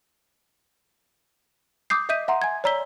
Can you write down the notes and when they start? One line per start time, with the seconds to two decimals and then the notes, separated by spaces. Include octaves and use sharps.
1.90 D6 D#6 G6 C7
2.09 D#5 E5 D#6 G6 B6 D#7
2.28 E5 F#5 A#5 C6
2.42 G#5 G#6
2.64 C#5 D5 A#5 E6 B6 G7